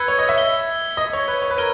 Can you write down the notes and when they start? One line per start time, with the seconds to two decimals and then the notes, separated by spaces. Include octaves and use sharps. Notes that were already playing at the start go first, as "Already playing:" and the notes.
Already playing: B4 E6 G#6 C#7 G7
0.08 C#5
0.19 D#5
0.29 E5
0.38 G#6 B6 G7
0.97 D#5
1.13 C#5
1.28 B4
1.42 C#5
1.50 B4
1.57 A#4 G#6 D#7 G7